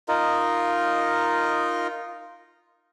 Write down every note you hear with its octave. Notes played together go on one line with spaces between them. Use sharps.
D#4 F4 A#4 D#5